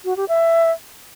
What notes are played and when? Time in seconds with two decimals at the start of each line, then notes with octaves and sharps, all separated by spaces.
0.05 F#4
0.17 G4
0.29 E5